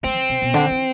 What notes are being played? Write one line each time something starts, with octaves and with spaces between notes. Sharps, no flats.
A3 C4
C3
C3
B2
D3
E3